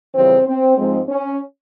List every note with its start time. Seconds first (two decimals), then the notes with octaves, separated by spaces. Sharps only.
0.15 F2 C#3 E3 G3 C4
0.47 C4
0.78 G#2 F3 G#3 C4
1.09 C#4